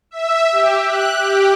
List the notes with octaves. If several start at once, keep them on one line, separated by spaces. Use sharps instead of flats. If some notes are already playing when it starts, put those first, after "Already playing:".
E5
G4
F#6
G4